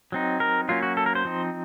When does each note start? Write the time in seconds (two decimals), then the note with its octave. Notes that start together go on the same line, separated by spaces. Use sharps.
0.12 F#3 C4 D#4
0.40 A#4
0.69 F#3 A#3 C#4 F4
0.83 F#4
0.97 A4
1.06 A#4
1.15 C5
1.25 F3 C4 D#4